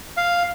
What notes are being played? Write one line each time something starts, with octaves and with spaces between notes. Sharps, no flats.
F5